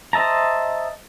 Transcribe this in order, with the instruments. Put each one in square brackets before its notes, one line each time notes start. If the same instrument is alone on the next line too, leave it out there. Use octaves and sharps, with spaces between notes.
[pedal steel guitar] C5 D#5 E5 A5 A#5